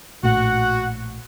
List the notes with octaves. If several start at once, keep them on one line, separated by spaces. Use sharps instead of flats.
A#1 A2 F#4 F#5